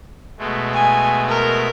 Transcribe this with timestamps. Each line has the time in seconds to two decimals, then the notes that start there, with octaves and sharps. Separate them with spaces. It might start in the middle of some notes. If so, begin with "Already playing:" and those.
0.38 B2 G#3 A3
0.73 G#5
1.28 A#4